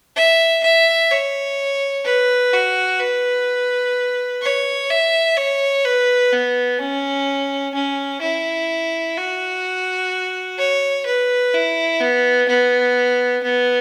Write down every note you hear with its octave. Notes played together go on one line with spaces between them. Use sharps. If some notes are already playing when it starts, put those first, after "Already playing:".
E5
E5
C#5
B4
F#4
B4
C#5
E5
C#5
B4
B3
C#4
C#4
E4
F#4
C#5
B4
E4
B3
B3
B3